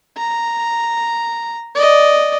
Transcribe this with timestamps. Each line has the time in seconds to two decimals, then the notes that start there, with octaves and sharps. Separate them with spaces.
0.17 A#5
1.75 D5 D#5